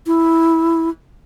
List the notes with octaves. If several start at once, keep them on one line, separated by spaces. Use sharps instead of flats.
E4